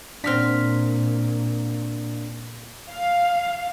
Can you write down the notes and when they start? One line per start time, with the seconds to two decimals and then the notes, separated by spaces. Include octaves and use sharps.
0.24 A#2 C4 D4 F#4 F6 B6
2.90 F5